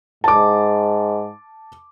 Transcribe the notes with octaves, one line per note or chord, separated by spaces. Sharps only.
G#2 A5 D6